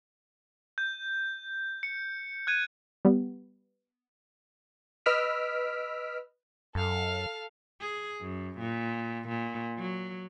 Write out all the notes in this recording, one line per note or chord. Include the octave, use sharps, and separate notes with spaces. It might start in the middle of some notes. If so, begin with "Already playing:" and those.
G6
C#7
F#6 G#6 D#7
G3 B3
B4 D#5 E6 F6 B6 D7
F#2 A4 F5
G#4
F#2
A#2
A#2
F#3